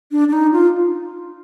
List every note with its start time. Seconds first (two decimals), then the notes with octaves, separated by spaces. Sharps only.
0.11 D4
0.28 D4
0.33 D#4
0.52 F4